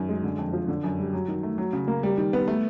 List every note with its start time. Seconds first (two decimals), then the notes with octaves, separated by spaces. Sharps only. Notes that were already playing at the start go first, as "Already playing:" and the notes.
Already playing: F#2 D#3
0.09 G#3
0.24 D3
0.38 F2
0.53 F3
0.68 D3
0.84 F#2
0.98 G3
1.13 F#3
1.28 D#3
1.43 A3
1.58 F#3
1.73 C#3
1.88 A#3
2.03 G3
2.18 D#3
2.33 B3
2.48 A3